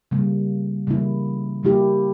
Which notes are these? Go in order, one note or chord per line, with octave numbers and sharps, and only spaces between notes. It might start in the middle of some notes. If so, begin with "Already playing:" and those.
C#3 G3 A#3
C#3 E3 G3 A#3 E4
C#3 G3 A#3 E4 G4